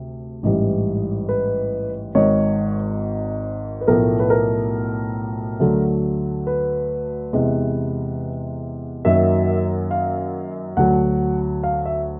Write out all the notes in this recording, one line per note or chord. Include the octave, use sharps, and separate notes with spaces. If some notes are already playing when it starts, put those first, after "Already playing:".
Already playing: D2 C3
A1 G#2 E3 G3
B4
G#1 G#2 D#3 C#5
B4
B1 A2 F3 A3 A#4
B4
A#4
D2 D3 F#3 A3
B4
E2 C3 E3 G#3
F#2 D#3 F#3 A#3 E5
F5
D2 D3 F#3 F#5
F5
E5